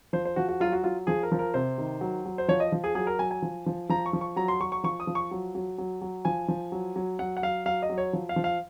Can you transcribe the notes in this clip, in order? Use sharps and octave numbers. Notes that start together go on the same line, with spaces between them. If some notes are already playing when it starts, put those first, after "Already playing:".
F3 C5
C5
F3 F#4
F#4
F#3 F4
F#4
F#3 F4
F3 G#4
A#4
F3
A#4
C3 C5
D#3
F#3
F#3
C5
F3 C#5
D#5
F3
G#4
F#3 G#4
A#4
F#3 G#5
G#5
F3
F3
F3 A#5
C#6
F3
C#6
F#3 A#5
C6
F#3 C#6
C#6
F3 C#6
D#6
F3
C#6
F#3
F#3
F#3
F#3
F3 G#5
F3
F#3
F#3
F#3 F#5
F#5
F#3 F5
F#3 F5
D#5
F#3
C#5
F3
F5
F3
F5